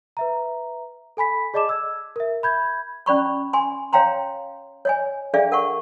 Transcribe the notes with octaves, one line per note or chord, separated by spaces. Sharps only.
B4 E5 A#5
A4 G#5 B5 B6
G#4 D5 D#5 A5 D6 E7
E6 G#6
A#4 E5
E5 B5 G6 G#6
C#4 D5 B5 C#6
G#5 C6
C#5 F5 G5 A#5 C6
C#5 D#5 G#5
D4 G#4 A4 D5 E5 F5
A#4 F#5 C#6